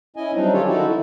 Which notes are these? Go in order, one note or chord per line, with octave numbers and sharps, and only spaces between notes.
C#4 E4 D#5 G#5
F#3 G3 C4 D4 D#4
D#3 C#4 F4 G4 A4 C#5
D#4 E4 F#4 A4
D#3 E4